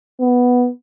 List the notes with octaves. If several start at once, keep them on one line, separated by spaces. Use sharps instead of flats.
B3